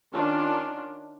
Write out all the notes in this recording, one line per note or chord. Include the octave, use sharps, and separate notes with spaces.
D#3 C#4 D4 F4